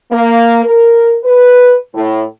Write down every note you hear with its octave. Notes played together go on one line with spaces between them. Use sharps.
A#3
A#4
B4
A2